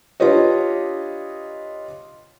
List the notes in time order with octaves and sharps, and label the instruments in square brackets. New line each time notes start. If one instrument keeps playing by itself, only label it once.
[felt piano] D4 F4 G4 B4 C#5 D#5